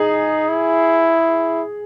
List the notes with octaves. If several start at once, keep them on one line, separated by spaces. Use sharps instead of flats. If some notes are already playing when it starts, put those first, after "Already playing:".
Already playing: D#4 G#4
E4